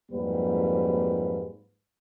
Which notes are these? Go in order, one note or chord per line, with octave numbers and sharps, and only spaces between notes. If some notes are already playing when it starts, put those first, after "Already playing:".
F2 G#2 F#3 G3 A#3 B4